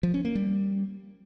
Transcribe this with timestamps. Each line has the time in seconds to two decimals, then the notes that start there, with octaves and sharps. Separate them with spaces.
0.03 F3
0.14 C#4
0.25 A#3
0.35 G3